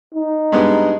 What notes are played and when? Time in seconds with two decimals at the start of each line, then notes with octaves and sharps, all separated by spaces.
0.15 D#4
0.52 G2 G#3 B3